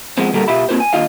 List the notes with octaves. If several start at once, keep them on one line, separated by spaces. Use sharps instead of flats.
F3 G#3 B3 C4
A#2 D3 G3 F#4 A4 A#4
B2 F4 G4 E5 B5
A#3 C4 F4 B4 C5
G#5
D#2 D4 F4 D#5 F5